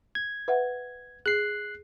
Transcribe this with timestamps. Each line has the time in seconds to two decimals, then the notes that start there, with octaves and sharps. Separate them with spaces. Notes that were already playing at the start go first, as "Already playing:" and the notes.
0.15 G#6
0.48 B4 E5 F#5
1.26 G#4 F#6 C7